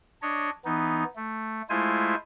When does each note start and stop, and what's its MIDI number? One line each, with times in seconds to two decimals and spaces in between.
0.22 0.50 62
0.22 0.50 73
0.22 0.50 75
0.65 1.04 52
0.65 1.04 59
0.65 1.04 63
1.16 1.62 57
1.70 2.15 56
1.70 2.15 57
1.70 2.15 64
1.70 2.15 65
1.70 2.15 72
1.70 2.15 80